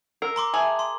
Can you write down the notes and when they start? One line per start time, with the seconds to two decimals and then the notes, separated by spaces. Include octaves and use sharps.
0.22 A#4 E6 C7
0.36 A#5 C6 D6
0.54 G#4 E5 A5 F#7
0.79 C6